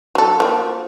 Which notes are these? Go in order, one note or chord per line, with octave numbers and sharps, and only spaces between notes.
F#3 A4
F3 A#3